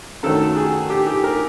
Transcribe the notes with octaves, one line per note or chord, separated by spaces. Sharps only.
F#2 D#3 F#3 A3 A4
G#4
G4
G4
A#4